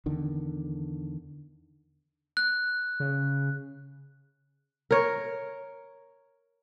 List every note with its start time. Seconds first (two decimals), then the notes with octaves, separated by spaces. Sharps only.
0.06 E2 D3 D#3
2.37 F#6
3.00 C#3
4.91 A#4 C#5